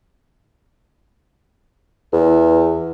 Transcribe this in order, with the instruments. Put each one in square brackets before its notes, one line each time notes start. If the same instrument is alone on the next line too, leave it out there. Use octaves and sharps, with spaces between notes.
[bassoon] E2